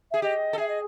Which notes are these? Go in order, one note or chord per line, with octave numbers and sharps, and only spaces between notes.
G#4 E5
G4 D#5
A4
G#4 E5
D#5